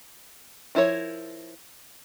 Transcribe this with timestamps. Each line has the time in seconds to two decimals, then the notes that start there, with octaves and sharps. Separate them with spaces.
0.75 F3 E4 A#4 C#5